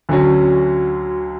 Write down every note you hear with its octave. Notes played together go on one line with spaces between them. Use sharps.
D2 D3 F#3 C#4